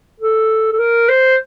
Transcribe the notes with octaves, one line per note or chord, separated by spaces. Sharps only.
A4
A4
A#4
C5